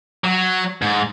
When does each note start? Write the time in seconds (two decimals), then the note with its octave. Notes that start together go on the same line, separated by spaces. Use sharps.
0.24 F#3
0.82 G#2